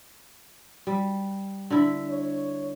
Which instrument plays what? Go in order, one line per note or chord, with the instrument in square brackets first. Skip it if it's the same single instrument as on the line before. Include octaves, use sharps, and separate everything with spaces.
[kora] G3
D3 E4
[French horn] C#5